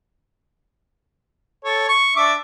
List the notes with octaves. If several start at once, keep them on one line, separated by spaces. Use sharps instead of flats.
A4 C#5
C#6
D4 E5 D6